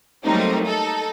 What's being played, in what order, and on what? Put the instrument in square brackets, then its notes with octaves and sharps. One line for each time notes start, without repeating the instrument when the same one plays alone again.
[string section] F#3 G3 A3 A#3 C4 D#4
D#4 A4